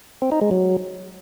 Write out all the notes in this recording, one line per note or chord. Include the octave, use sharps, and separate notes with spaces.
C4
D#4
G#3
F#3